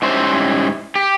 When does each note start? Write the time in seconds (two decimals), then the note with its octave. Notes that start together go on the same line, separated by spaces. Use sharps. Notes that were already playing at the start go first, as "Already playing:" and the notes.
0.02 G#2 G3 C#4 E4 C5
0.95 G4